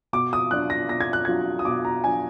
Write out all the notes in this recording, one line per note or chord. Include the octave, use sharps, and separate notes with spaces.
B2 D6
D#6
F#3 D4 F4 F#6
A#6
B2 A#6
G#6
F#6
F#3 D4 F4 G#6
D#6
B2 D6
A#5
F#3 D4 F4 G#5